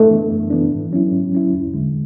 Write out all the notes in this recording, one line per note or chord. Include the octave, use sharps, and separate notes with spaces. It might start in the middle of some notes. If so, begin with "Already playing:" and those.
Already playing: F#2 A3
E3 B3 D4
F#2
E3 B3 D4
G#2
F#3 C#4 E4
G#2
F#3 C#4 E4
E2
D3 G#3